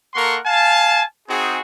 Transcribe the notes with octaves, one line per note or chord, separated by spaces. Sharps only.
A#3 A4 A#4 F#5 C6 C#6
F5 G#5 A5
C4 D#4 F#4 G#4